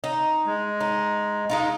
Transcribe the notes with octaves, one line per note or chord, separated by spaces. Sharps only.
D#4
G#3
D#4
G#3 D#4 F4